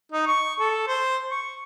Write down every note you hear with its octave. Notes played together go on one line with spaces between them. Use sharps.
D#4
C#6
A4
C5
C#6